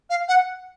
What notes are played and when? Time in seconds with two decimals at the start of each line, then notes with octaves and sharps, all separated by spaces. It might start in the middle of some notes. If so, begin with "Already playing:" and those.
0.10 F5
0.28 F#5